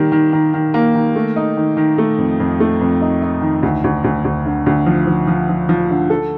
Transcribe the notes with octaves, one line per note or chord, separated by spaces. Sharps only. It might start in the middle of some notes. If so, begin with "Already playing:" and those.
Already playing: D#3 G3 A#3
D#3
D#3
D#3
A#3
D#3
A3
D#4
D#3
D#3
A3
F2
F2
A3
F2
D#4
D#4
D#3
D2
D2
D2
D2
D3
D2
F3
F3
F3
F3
F3
D3
A4